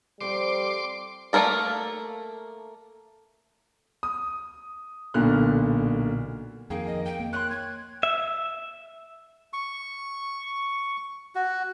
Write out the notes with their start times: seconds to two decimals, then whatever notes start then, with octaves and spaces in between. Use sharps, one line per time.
0.21 F3 G3 A3 C4 C6 D6
1.33 A3 A#3 C4 A#4 D5
4.03 D#6
5.14 B1 A#2 D3 F6 F#6
6.70 F2 D#3 A#3 G#4 G5
6.87 D#5
7.05 G5
7.20 A#3
7.33 C#5 G5 C6 F#6
7.51 G#6
8.03 E5
9.53 C#6
11.35 F#4